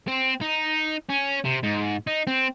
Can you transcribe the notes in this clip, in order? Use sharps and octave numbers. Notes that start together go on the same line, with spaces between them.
C4
D#4
C#4
C3
G#2
D#4
C4